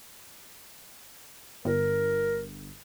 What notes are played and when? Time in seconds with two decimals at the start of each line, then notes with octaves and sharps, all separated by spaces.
1.65 G1 A#4